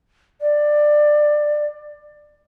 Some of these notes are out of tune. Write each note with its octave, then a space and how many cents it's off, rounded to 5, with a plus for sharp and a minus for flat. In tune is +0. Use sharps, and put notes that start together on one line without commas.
D5 +15